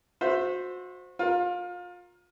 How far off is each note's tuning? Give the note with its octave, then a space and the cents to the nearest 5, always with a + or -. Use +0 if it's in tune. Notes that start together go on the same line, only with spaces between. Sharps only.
F#4 -30 C5 +0 E5 +0
F4 +30 A#4 +5